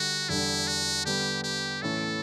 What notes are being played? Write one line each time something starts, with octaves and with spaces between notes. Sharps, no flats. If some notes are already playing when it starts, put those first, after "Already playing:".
Already playing: D3 G3 D4 F#4
E2 D3 G3 D4 E4
F#4
D3 G3 B3 G4
G4
A2 E3 A3 C#4 E4 A4